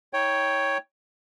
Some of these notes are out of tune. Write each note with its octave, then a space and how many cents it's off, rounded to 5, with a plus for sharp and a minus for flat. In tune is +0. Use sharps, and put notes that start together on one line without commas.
D#4 +40 C#5 +0 G5 +0